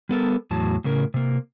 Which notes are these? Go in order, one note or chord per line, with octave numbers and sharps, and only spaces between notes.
G3 B3 A4 A#4
E2 A2 F#3 A5
A2 C#3 C#4 A#4
C3 A#3